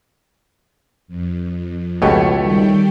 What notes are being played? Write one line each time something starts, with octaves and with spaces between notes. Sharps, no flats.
F2
C#2 B2 A3 G4 C#5
D#3 G3 G5